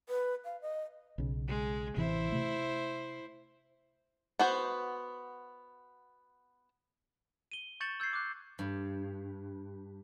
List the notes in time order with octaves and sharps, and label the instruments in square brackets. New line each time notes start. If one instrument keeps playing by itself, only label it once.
[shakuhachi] B4
F5
D#5
[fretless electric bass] B1 C#3
[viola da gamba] G#3
[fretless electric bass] A1 C3 E3 [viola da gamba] E4 C5
[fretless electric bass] C3 A3
[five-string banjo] B3 F#4 C5
[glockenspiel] D#7 G7
C#6 G6 A6 C#7 E7 F#7
E6 G6 G#6 C7
D6 F#6
[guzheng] G2